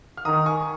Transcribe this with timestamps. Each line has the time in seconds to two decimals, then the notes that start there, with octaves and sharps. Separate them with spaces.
0.17 F6
0.25 D#3 A#5 D#6
0.46 G#5 C#6